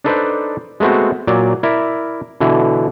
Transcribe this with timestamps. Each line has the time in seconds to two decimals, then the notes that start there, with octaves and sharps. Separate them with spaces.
0.04 D4 D#4 A4 B4 C5 D5
0.80 G#3 A3 B3 C4 F#4
1.27 A#2 F#3 D5
1.63 E4 A#4 D5 E5
2.41 B2 D3 E3